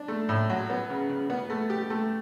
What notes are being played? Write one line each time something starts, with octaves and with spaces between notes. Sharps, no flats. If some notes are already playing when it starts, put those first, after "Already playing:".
Already playing: D4
A3
A2
F#3
B3
C#3
C#3
B3
A3
G4
A3